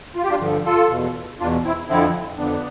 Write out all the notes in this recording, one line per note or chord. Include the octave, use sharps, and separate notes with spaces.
F4
G4
D4 F4
G2 D3 F3
F4 A4
E2 B2
E2 B2 D4 F4
C4 E4
F2 D3 F3 C4 E4
F2 D3 F3 B3 D4